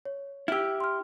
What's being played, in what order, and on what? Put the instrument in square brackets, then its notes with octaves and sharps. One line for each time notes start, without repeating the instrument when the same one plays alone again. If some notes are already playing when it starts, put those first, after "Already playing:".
[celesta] C#5
[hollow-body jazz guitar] E4 G4 [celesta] E6 F6
[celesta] C6 F6